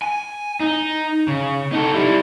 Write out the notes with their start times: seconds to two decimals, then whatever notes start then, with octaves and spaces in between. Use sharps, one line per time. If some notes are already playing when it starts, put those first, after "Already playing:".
0.02 G#5
0.60 D#4
1.28 C#3
1.72 D#4 A4
1.94 G3 E4